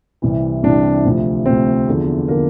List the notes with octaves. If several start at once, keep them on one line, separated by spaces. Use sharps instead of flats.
C2 C3 E3
C2 C3 E3 D4
D2 C3 F3
D2 C3 F3 C4
E2 D3 F3
D3 F3 A#3